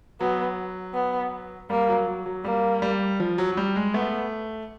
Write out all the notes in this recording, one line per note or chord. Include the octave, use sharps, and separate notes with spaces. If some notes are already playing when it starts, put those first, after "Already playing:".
F#3 B3
B3
G3 A#3
F#3
F#3
F#3
G3 A#3
G3
F3
F#3
F#3
G3
G#3
A3 B3